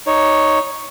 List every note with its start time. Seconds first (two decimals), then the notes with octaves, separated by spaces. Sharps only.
0.07 D#4 C#5